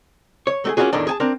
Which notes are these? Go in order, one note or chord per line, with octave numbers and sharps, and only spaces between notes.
C#5
A3 F#4 G#4
A#3 C#4 D#4 F4 F#4 G#4
E2 A2 D#3 D4
G#4 G#5 A5
C4 D4 A#4